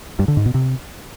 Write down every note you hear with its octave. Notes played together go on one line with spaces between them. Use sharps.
G2
D3
G#2
B2
C3